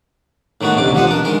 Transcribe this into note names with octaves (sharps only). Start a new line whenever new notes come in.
A2 D#3 A3 B3 F#4
A1 D2 G#2 C3 D6
B2 F3 B3 D#5 F#5
D4 A#4
D#3 G#3 A#4